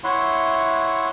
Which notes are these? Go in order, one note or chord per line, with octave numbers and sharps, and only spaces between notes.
E4 C#5 E5 F#5 C6